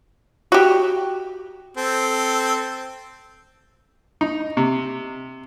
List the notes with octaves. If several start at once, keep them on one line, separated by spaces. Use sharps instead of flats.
F#4 G4
C4 A4
D#4
C3